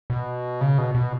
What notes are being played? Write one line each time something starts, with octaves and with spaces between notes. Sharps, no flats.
B2
C#3
B2
B2